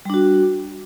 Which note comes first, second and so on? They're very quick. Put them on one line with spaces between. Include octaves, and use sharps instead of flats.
G3 D4 F#4